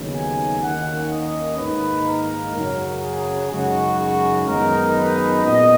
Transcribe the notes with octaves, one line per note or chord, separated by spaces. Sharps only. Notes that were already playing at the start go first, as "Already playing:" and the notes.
Already playing: D#2 C#3 F#3 B3
G#5
D#2 D#3 A#3 C#4 F#5
D#5
G#2 D#3 A#3 D#4 B4
A#4
F#2 C#3 F#3
G#4
F#2 C#3 G#3 D#4 F#4
F#4
F#2 D#3 G#3 B3 D#4 A#4
B4
A#2 G#3 B3 D#5